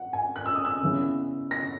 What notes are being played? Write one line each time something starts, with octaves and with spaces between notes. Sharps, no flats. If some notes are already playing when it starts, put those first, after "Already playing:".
Already playing: F#5
G#5
F#6
E6
D#6
E6
C#3 E3 B3
A#6